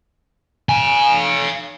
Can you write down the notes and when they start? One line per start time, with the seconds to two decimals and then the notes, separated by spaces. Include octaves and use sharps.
0.69 F5 G#5